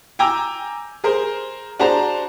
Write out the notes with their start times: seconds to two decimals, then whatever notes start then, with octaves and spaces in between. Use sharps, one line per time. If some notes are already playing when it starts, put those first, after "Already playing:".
0.19 G5 G#5 A#5 D6 E6
1.04 G#4 A#4 C5
1.79 D4 F#4 G#4 C5 A#5